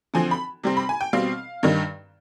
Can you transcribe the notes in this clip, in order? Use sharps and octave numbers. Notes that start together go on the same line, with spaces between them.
D3 F3 C4 G#5
B5
C3 G3 C4
B5
G#5
G5
B2 G3 C4 F5
G2 D#3 G3